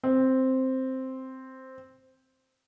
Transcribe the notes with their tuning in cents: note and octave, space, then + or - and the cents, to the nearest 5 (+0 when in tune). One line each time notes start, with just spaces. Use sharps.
C4 +0